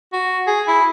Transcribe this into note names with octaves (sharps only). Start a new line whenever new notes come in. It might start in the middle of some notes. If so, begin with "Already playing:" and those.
F#4
G#4
E4